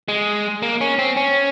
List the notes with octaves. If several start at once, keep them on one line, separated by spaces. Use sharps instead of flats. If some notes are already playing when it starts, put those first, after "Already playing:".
G#3
A#3
C#4
C4
C#4